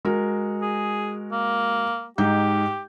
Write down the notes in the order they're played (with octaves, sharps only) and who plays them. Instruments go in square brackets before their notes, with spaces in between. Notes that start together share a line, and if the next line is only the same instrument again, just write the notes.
[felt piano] G#3 F#4 A#4
[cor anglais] G#4
A#3
[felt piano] G#2 D#4 G6 [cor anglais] G4